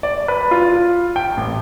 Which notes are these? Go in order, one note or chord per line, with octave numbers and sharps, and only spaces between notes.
D5
B4
F4
G5
A1